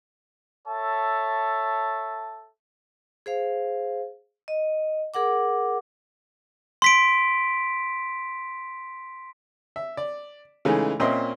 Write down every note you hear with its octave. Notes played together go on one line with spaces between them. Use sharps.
A4 C#5 E5 A5
G#4 C5 F5
D#5
G#4 A#4 F#5 D6
C6 B6 D7
E5
D5
C#3 E3 G#3 A3 D#4
A#2 C4 C#4 D#5 E5 C6